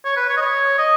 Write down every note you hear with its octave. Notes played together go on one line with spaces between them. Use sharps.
C#5
B4
C#5
D#5
C#5
D#5